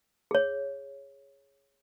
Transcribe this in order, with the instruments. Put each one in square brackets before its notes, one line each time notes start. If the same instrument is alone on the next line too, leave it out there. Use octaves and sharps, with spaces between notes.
[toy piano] G#4 C#5